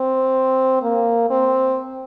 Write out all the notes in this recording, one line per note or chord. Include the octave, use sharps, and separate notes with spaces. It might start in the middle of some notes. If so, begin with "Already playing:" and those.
Already playing: C4
A#3
C4